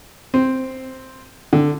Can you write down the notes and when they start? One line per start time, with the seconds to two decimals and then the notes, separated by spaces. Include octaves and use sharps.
0.34 C4
1.53 D3